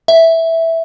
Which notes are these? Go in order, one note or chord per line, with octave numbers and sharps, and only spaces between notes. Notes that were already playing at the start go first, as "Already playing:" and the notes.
E5